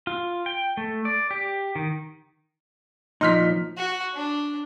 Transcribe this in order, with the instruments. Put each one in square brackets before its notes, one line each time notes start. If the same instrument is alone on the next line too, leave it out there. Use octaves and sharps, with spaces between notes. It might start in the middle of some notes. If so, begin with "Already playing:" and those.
[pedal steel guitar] F4
G5
A3
D5
G4
D#3
[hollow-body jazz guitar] A#2 F3 [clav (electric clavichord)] D#4 [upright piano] C6 F6 B6
[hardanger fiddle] F#4
D4